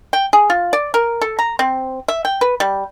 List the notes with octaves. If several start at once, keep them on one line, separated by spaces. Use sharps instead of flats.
G5
G#4
F4
D5
A#4
A4
A#5
C4
E5
G5
B4
G3